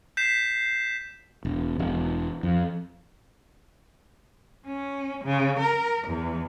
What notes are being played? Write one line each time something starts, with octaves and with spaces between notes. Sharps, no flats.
G6 B6 C7 E7
E1
E1
F2
C#4
C#3
A#4
E2